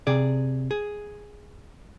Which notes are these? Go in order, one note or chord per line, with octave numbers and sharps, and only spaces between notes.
C3 G#4 D5
G#4